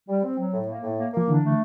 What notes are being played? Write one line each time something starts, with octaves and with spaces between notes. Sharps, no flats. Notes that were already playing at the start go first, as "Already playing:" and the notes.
G3
C4
F#3
A2
A#3
A2
A#3
F3 A#3
D3 E3 D4
A3